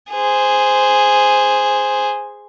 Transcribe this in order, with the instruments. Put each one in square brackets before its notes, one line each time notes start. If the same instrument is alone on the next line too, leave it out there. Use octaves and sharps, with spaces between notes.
[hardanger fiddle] G#4 C5